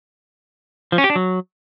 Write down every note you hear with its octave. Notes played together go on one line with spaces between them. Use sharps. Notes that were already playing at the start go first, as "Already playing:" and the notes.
F3
C#4
G4
D4
F#3